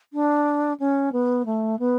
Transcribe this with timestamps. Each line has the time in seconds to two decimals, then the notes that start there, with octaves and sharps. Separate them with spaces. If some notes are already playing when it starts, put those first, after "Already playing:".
0.13 D4
0.79 C#4
1.12 B3
1.45 A3
1.79 B3